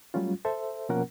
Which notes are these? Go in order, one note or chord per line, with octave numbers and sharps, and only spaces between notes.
F#3 G3 A3 C#4 F4
A4 C5 E5
B2 F3 A#3 C#4 A#4 F#5